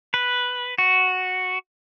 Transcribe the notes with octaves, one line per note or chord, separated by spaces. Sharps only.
B4
F#4